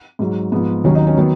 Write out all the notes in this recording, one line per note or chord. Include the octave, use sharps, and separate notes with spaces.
G#2 F#3
G#2 F3 B3
D#2 D#3 F#3 C#4
D#4
C#4
D#3 F#3 B3